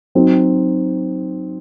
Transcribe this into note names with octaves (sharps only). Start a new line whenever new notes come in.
F#3 C4 D#4